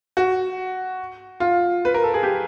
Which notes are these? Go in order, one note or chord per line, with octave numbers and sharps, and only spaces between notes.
F#4
F4
B4
A#4
A4
G#4
G4